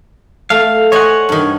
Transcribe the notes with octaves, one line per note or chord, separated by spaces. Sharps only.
A3 F5
C5 C#5 D#5 F#5 G#5
G2 D#3